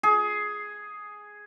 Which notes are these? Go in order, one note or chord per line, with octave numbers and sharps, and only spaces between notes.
G#4